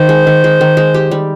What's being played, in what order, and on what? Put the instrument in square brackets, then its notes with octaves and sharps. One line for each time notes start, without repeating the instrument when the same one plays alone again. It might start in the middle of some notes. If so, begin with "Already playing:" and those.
Already playing: [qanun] D#3 [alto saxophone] C5
[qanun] G#3
D#3
G#3
D#3
G#3
G4
G3